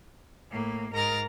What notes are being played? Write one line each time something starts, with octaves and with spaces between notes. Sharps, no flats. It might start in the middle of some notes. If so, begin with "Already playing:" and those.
A2 A#3
G#2 A#4 A#5 F6 A6